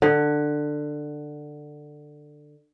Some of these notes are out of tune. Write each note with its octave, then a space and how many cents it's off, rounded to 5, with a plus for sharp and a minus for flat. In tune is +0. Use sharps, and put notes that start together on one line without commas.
D3 +15